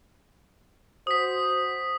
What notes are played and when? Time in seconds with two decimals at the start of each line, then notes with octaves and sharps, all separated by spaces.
1.07 F#4 C5 D#6 B6